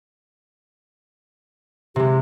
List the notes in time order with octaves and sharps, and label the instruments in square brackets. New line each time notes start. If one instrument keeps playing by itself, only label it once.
[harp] C3 G#3 [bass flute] G4